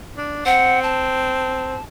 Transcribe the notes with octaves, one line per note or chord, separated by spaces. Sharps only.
D4
C4 F#5
A5